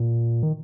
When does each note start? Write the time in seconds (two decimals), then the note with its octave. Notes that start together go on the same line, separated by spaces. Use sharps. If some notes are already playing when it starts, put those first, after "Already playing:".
Already playing: A#2
0.43 D#3